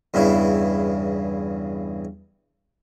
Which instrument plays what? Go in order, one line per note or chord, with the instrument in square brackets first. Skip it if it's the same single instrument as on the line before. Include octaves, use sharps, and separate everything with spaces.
[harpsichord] E2 G2 C#3 E4